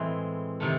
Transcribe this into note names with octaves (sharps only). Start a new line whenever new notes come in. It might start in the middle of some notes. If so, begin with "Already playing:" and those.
Already playing: A2 E3 G#3 C4
C3 D#3 A3